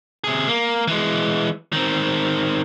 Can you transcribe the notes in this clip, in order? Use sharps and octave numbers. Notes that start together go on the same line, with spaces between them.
C3 G#4
A#3
E3 G#3
D#3 C4